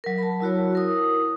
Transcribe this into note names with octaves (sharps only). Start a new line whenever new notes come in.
F#3 A#4
A5 B5
F#3 E4 F#4 C#5
E4 A#4 D#6